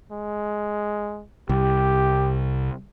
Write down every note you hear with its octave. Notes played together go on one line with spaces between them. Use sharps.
G#3
C2 G4